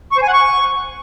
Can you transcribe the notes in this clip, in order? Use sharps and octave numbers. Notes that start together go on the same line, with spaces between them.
C#6
C5
G#5
F#5
C#6